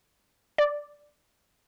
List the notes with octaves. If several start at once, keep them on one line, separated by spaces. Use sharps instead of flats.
D5